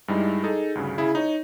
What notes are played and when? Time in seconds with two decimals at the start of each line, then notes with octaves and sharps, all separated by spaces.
0.08 G2 G3 G#3 D#4 E4
0.43 D#4 G#4 A4
0.75 D2 G2 C#3
0.98 C#3 E4 G#4
1.15 D#4 C#5